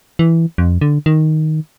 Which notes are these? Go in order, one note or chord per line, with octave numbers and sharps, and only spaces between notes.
E3
F2
D3
D#3